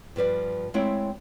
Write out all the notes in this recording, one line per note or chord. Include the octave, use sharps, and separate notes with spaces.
G2 F3 B4 D5
G#3 A3 C4 E4 C#5 G5